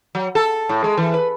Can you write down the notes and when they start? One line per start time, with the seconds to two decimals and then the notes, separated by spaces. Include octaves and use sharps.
0.15 F#3
0.35 A4
0.69 A2
0.84 G#3
0.98 E3
1.14 B4